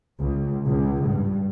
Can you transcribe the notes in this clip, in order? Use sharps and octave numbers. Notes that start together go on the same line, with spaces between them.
C#2
C#2
G2